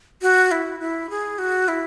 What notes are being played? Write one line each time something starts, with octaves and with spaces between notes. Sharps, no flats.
F#4
E4
E4
G#4
F#4
E4